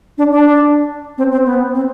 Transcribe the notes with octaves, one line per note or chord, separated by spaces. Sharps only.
D4
D4
C4
C4
B3
C4